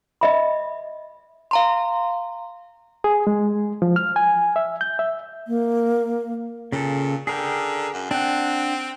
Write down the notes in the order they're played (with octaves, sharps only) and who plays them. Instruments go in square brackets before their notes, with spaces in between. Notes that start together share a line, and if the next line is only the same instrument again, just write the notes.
[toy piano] D#5 E5 B5
[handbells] F5 A#5 C6
[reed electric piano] G#4
G#3
F3
F6
G#5
E5
G6
E5
[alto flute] A#3
[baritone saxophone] A#2 [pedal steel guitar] C#3 A4
[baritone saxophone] D3 [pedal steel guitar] G#4 A#4 G5
[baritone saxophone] F#2
[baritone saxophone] C4 [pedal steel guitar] D4 F#5